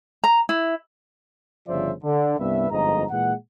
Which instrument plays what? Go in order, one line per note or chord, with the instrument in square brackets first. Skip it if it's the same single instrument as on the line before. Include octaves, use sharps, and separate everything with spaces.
[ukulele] A#5
E4
[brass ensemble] G1 C#3 F3 C5 D5 E5
D3
C2 G2 B3 B4 E5
G1 F2 G#2 D#5 A#5
A#2 E3 G#3 F#5